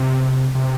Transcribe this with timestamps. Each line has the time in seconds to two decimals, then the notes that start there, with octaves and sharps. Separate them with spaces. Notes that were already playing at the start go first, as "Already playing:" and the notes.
Already playing: C3
0.55 C3